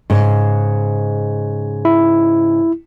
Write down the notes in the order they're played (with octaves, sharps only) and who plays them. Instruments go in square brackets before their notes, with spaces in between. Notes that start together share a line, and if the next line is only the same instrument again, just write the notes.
[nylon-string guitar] G#2 C#3
[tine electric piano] E4